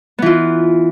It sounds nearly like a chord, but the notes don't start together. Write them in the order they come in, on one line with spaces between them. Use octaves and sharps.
B3 E3 F4